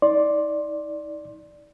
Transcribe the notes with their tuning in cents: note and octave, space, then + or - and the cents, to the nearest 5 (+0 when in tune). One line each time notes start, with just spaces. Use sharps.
D#4 +35 D5 +0 C6 +20